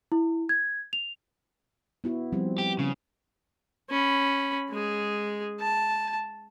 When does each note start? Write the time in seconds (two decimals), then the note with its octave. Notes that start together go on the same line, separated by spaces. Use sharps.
0.12 E4
0.49 G#6
0.93 F7
2.04 B3 E4 F#4
2.32 F3 G3 C4
2.58 G4
2.79 C#3 C#4
3.89 C#4 B5
4.70 G#3 G#4
5.60 A5